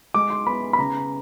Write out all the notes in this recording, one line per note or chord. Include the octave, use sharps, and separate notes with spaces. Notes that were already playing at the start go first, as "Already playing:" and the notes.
G#3 D6
C6
B3 B5
B5
C#3 A#5